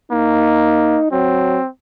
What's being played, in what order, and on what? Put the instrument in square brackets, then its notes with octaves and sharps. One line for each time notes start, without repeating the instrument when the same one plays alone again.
[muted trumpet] A#3 [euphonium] D#4
[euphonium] F#3 [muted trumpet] C4